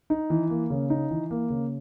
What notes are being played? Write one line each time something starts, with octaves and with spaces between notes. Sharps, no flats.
D#4
E3
A#3
C#3
D#4
E3
A#3
C#3